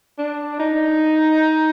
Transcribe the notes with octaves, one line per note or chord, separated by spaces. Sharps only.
D4
D#4